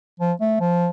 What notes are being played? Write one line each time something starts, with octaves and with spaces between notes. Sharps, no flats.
F3
A3
F3